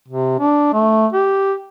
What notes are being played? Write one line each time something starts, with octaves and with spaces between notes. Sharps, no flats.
C3
D4
A3
G4